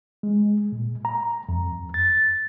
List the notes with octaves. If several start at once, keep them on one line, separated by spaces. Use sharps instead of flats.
G#3
A#2
A#5
F2
A6